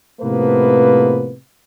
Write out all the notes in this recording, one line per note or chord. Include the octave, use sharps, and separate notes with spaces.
A2 C3 F3 A#3 B3 B4